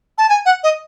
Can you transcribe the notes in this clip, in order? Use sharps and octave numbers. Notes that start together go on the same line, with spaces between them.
A5
G#5
F#5
D#5